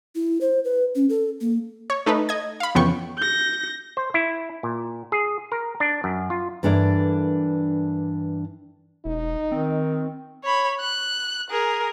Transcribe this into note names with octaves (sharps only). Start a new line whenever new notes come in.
E4
C5
B4
C#4
A4
A#3
C#5
A3 D#4 A4 B4
D#5 G#6
F5 B5
F2 C#3 E3 B3 G5 C#6
G6 A#6
C5
E4
A#2
G#4
A#4
D4
F#2
F4
G2 E3 D4 A4 A#4 D5
E1 D#4
D#3 C4
C#5 B5
F#6
G#4 A#4